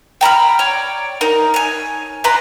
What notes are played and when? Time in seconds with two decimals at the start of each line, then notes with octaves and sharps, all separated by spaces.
0.21 G5 A#5 B5 F6
0.59 C#5 D5 G5
1.21 D#4 A#4
1.54 C#5 G#5
2.24 B4 D5 A#5 C6